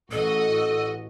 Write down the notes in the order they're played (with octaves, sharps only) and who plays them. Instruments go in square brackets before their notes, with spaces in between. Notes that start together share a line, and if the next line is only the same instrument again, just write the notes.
[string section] A1 F#4 D#5 [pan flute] A4